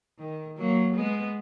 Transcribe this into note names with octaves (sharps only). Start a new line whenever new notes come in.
D#3
F#3 A#3
G#3 B3